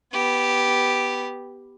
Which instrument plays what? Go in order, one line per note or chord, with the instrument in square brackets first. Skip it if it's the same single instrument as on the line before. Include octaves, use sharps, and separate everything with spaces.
[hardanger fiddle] B3 G4